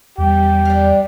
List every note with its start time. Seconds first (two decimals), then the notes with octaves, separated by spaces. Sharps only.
0.18 E2 G3 G4
0.65 D4 F5